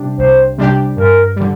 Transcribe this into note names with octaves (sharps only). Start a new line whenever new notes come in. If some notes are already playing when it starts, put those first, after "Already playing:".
Already playing: C3 G3 D4 G4
C2 C5
C3 G3 D4 G4
G2 A#4
D3 G3